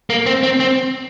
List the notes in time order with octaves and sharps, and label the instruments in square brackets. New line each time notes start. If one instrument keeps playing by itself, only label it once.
[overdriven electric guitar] A#3
C4
C4
C4